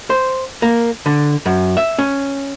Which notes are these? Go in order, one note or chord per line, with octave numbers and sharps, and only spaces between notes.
C5
A#3
D3
F#2
E5
C#4